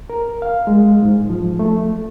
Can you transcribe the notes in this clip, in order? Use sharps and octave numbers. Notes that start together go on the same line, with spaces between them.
A#4
F5
G#3
G#2
F3
A3